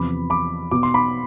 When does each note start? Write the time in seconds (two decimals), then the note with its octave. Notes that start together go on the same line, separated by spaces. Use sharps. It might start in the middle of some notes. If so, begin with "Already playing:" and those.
Already playing: E2 C3 F3 B5 D6
0.30 B5 D6
0.71 B2 B3 D6
0.83 C6
0.94 B5 D6